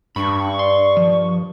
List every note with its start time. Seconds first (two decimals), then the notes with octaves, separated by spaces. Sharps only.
0.16 G2 D4 B5 C#6
0.59 D5 C6
0.97 F3